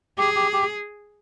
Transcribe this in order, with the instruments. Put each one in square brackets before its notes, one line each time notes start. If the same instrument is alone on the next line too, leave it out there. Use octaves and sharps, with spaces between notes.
[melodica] G4 [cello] G#4
[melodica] G4
G4